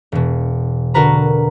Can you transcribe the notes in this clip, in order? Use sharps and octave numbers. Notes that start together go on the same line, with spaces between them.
E1 B2
D3 F#4 A#4 B4 A#5